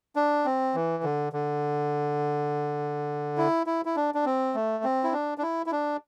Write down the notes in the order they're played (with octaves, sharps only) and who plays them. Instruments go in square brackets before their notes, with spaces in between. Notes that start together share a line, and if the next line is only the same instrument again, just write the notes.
[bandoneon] D4
C4
E3
D3
D3
E4
E4
E4
D4
D4
C4
A3
C4
E4
D4
D4
E4
E4
D4